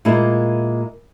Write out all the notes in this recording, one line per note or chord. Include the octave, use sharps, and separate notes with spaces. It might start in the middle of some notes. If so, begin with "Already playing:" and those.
A#2 G#3 A#3 E4